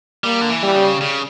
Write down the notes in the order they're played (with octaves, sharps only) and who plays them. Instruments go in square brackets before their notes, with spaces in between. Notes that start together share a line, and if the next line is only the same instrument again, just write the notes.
[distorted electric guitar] G3 [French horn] A#3
[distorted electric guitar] D3
E3
[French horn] G3
[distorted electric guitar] C#3
C#3